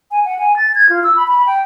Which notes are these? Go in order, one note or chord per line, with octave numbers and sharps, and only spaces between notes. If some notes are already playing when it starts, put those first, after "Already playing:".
G#5
F#5
G#5
A6
G#6
F4
E6
B5
B5
G5